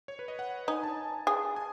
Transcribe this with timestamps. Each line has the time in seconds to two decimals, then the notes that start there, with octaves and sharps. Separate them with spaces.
0.08 C#5
0.19 B4
0.28 D#5
0.39 F#5
0.68 D#4 G#5
0.83 A5
1.27 G#4
1.56 G#5